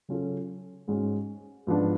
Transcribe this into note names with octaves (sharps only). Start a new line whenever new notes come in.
C#3 F#3 C#4 F4 A4
G#2 G#3 C#4 F#4
G#2 F3 B3 D4